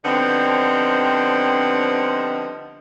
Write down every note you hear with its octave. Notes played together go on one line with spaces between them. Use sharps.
D3 F3 G3 B3 C4 D#4